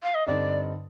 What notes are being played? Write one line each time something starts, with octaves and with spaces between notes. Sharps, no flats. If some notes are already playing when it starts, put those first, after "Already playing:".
F5
D#5
G2 D3 G3 C4 D#4 D5